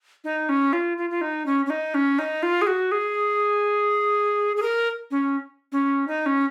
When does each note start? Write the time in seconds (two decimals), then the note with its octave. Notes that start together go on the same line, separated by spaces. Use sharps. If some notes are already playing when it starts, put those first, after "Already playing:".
0.24 D#4
0.49 C#4
0.73 F4
0.97 F4
1.10 F4
1.21 D#4
1.46 C#4
1.66 C#4
1.70 D#4
1.94 C#4
2.19 D#4
2.43 F4
2.62 G#4
2.67 F#4
2.92 G#4
4.57 G#4
4.62 A#4
5.11 C#4
5.72 C#4
6.08 D#4
6.26 C#4